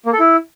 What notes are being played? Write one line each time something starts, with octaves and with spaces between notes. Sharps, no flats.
A#3
A4
E4